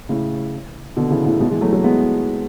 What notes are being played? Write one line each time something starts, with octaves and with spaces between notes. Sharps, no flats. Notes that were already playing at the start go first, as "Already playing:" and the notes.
A2 C#3
B2 D3
C#3 E3
A2 C#3
G#2 B2
E3 G#3
F#3 A3
F#3 A3
G#3 B3